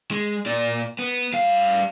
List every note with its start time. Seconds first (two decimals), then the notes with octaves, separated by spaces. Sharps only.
0.11 G#3
0.46 A#2 D5
0.99 B3
1.33 G3 F5